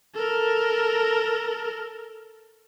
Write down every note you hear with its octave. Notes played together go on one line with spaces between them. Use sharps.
A4 A#4